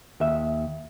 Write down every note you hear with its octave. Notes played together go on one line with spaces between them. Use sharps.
D#2 E5